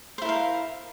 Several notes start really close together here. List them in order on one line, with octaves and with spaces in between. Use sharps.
C5 E4 A#4 F5